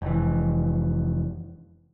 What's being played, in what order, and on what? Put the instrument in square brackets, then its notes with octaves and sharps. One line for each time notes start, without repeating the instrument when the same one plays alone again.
[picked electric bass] F1 E3